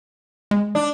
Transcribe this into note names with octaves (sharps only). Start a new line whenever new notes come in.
G#3
D4